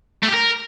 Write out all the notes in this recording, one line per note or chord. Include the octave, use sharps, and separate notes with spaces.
A3
G4
A#4